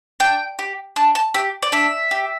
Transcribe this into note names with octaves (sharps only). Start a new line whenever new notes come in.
D4 G5
G4
D4 A5
A5
G4 E5
D5
D4 E5
G4